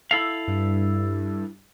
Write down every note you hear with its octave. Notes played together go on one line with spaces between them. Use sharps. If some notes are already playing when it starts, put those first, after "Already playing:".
E4 A4 F5
G2